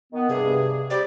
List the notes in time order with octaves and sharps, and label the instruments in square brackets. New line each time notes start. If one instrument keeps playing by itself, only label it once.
[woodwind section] D#3 B3
[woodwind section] G2 C3 [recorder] G#4
[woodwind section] G3 C4 G4 [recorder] D5